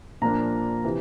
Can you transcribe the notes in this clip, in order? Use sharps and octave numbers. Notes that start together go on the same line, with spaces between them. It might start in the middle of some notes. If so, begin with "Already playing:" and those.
A#2 F3 A#3 D4 A#5
C3 E3